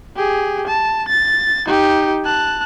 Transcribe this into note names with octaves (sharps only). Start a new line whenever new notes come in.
G4 G#4
A5
A6
D#4 G4
A5 F#6